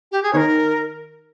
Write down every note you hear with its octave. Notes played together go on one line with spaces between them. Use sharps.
G4
G#4
D#3 A#4 C#5